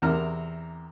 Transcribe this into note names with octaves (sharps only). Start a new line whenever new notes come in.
E2 C3 A#4 A#5 F6